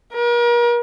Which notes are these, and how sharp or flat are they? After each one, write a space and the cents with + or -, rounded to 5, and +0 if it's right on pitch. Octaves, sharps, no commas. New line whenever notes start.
A#4 +40